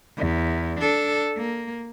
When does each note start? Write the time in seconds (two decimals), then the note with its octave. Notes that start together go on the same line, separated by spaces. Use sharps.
0.17 E2
0.80 D4 A4
1.37 A#3